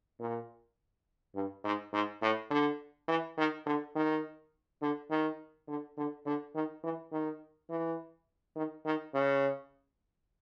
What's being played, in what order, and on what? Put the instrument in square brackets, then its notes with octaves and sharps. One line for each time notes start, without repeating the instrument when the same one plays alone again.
[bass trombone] A#2
G2
G#2
G#2
A2
D3
E3
D#3
D3
D#3
D3
D#3
D3
D3
D3
D#3
E3
D#3
E3
D#3
D#3
C#3